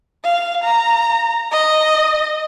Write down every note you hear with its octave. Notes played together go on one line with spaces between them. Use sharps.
F5
A#5
D#5